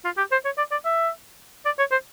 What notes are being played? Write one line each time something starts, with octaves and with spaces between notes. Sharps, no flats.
F4
G4
C5
C#5
D5
D5
E5
D5
C#5
C5